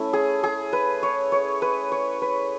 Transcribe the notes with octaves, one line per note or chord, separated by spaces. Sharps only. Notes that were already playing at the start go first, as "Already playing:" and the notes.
Already playing: A3 C#4 E4
G#4
G#4
B4
C#5
C#5
B4
C#5
B4